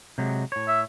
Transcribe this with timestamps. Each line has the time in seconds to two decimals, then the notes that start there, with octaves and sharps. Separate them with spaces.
0.18 C3 F#3 G#3
0.52 A2 C#5
0.68 E5